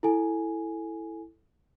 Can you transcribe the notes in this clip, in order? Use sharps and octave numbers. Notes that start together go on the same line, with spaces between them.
E4 A4 G#5